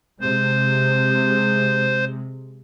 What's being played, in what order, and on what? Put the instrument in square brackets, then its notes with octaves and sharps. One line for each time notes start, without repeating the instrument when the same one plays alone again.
[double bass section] C3 G#3 [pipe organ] C5